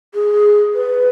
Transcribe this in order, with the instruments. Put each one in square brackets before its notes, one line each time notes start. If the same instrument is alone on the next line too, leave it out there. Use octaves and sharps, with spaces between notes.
[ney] G#4
B4